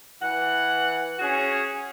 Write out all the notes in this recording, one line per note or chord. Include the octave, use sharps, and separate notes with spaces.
E3 F#5
C#4 F#4 G#4